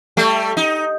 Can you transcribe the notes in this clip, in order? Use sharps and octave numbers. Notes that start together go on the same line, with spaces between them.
G3 A3
D#4